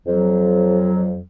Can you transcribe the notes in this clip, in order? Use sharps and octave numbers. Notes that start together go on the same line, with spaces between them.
F2 F#3